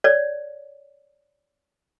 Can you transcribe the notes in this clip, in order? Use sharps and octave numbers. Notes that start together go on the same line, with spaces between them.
C#5 D5